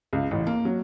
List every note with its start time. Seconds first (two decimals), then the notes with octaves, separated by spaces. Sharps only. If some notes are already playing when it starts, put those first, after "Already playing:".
0.13 C#2
0.31 A1
0.47 A#3
0.65 F#3